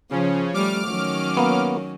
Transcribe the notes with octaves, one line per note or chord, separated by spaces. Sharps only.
C#3 F3 C#4
G3 A3 D6 F6
D#3 F#3 C#4
A#3 B3